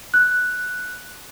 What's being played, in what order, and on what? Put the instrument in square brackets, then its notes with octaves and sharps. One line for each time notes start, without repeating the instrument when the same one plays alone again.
[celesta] F#6